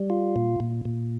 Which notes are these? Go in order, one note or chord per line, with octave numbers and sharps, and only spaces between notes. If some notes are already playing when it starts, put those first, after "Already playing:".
Already playing: G3
F4
A#2
A#2
A#2